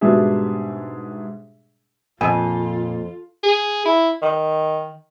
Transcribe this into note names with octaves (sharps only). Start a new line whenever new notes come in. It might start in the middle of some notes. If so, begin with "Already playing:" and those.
G#2 B2 G3 D4 G#4 E5
F2 A#2 F4 G#5
G#4
E4
D#3